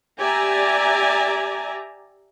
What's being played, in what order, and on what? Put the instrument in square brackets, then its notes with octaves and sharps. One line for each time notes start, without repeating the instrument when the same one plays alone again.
[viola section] G4 D5 E5 G#5 A#5